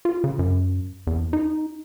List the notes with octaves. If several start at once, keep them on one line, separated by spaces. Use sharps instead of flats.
F4
C#3
F#2
E2
D#4